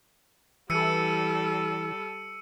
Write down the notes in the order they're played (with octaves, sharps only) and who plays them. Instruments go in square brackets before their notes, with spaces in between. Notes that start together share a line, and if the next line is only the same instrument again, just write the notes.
[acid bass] E3 [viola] G3 A4 [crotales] E6 C#7 D#7